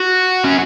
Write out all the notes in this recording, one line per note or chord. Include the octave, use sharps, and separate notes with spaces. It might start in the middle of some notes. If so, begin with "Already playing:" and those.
Already playing: F#4
C#4